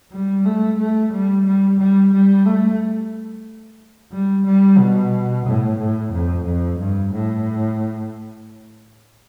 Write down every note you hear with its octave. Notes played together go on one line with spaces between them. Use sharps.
G3
A3
A3
G3
G3
G3
G3
A3
G3
G3
B2
A2
A2
F2
F2
G2
A2